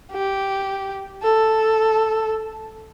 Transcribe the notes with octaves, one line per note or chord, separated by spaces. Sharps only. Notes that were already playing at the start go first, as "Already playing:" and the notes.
G4
A4